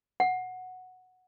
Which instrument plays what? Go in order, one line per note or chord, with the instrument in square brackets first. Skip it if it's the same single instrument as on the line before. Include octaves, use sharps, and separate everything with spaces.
[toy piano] F#5